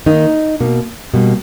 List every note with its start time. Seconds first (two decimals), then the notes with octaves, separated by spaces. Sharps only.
0.06 D#3 A#3 D#4
0.60 B2 A#3
1.14 B2 G3 A#3